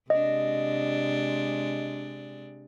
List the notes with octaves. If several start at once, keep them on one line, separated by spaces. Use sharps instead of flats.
C3 G#3 D4 D#5